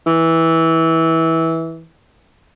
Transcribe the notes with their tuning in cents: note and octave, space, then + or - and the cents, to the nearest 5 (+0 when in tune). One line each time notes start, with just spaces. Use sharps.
E3 -15